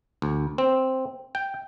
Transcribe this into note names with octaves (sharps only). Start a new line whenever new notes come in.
D2
C4
G5